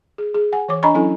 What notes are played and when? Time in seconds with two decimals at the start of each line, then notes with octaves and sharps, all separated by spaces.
0.18 G#4
0.34 G#4
0.52 F#5 G#5
0.68 E3 C#5 D6
0.83 D4 D#5 G#5 A#5 B5 C#6
0.94 F#3 C#4 E4 A4 G#5